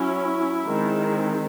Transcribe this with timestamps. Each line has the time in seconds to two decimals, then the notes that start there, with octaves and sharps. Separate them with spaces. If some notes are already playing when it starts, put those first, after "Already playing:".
Already playing: F#3 C#4 E4
0.67 D#3 G#3 C4